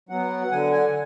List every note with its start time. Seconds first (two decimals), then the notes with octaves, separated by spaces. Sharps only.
0.09 F#3 B3 F#5
0.51 D3 G#5
0.72 G#5